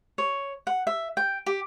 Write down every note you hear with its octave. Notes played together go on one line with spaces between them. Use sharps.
C#5
F#5
E5
G5
G4